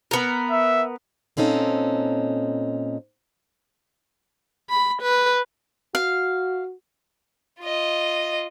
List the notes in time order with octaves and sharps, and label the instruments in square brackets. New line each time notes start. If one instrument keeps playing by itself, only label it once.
[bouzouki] B3 A#4
[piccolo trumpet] E5
[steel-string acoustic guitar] A#2 C4 C#4 D#4 A4
[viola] B5
B4
[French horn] F#4 [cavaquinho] F5
[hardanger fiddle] F4 D#5